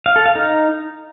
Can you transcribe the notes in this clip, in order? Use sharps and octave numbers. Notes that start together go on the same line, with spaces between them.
F5
A4
F5
D#4